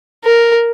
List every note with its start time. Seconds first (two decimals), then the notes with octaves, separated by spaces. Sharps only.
0.25 A#4